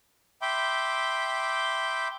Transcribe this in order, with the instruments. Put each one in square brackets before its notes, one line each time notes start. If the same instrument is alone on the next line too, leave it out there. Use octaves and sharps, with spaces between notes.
[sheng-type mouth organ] E5 G5 B5 C6 D6